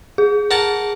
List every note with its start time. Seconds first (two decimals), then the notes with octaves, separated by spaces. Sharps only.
0.18 G#4
0.51 A#4 F#5 A5